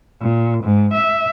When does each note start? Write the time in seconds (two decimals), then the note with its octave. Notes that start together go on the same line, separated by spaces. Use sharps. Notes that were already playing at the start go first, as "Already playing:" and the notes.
0.20 A#2
0.63 G#2
0.93 E5